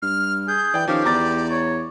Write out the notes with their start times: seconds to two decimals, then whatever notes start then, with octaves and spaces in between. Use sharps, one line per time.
0.02 G2 F6
0.48 G#4 G6
0.74 E3 D5 G5
0.88 D#3 F3 C#4 G4 F5
1.05 E2 D5 A#5 D6 A6
1.51 C#5